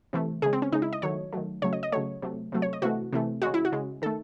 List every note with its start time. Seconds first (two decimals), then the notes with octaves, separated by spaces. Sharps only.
0.13 C3 E3 A3
0.42 C#3 G#3 G#4
0.53 C4
0.62 C#4
0.72 C#3 G#3 D#4
0.82 E4
0.93 D#5
1.02 D#3 F#3 A3 C#5
1.33 D#3 F#3 A3
1.62 C#3 F#3 A3 C#5
1.73 D#5
1.83 D#5
1.92 C#3 F#3 A3 C#5
2.22 C3 F#3 A3
2.52 C3 F#3 A3
2.62 C#5
2.73 D#5
2.82 C3 E3 A3 F#4
3.13 C3 E3 A3
3.42 C#3 G#3 F#4
3.54 E4
3.65 F#4
3.72 C#3 G#3
4.02 D#3 A3 A4